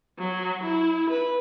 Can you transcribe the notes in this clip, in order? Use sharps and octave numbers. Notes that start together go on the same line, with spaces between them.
F#3
E4
B4